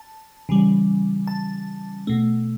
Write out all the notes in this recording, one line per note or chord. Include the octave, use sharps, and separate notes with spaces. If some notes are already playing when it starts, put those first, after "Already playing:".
Already playing: A5
C#3 E3 G3
A5
B2 A3